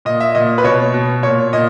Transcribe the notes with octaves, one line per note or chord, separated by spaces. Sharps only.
A#2 D#5
E5
A#2 D#5
B4
B2 C#5
B2
A#2 C#5
A#2 D#5